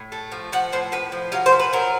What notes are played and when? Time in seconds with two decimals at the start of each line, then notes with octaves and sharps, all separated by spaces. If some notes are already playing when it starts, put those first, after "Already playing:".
Already playing: A2
0.12 A3
0.32 F3
0.52 F3 F#5
0.72 A2 C5
0.92 A2 B4
1.12 F3
1.32 F#3 F5
1.46 C5
1.52 A#2
1.59 B4
1.73 F#3 A#4